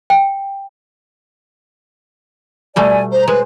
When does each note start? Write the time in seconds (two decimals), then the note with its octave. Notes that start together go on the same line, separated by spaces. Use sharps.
0.10 G5
2.76 B2 G3 A3 D5 G#5
3.12 C5 A#5
3.28 G#3 B4 C5